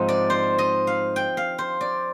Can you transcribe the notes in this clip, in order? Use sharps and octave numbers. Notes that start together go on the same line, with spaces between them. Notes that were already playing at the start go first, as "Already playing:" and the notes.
Already playing: G#2 F3 G#3 C4 D#4 C5
D5
C5
D#5
F5
G5
F5
C5
D5